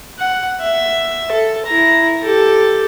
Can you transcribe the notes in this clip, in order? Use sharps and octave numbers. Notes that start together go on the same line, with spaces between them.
F#5
E5
A4
E4 A#5
G4 A4